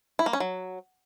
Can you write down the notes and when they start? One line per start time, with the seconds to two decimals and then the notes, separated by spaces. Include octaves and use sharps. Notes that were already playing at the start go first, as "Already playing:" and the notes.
0.19 E4
0.26 A#3
0.33 C#4
0.40 F#3